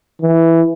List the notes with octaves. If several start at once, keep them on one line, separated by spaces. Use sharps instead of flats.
E3